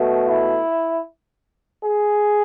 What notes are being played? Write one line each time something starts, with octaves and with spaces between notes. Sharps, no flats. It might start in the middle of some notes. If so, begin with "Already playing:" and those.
Already playing: B2 A3
E4
G#4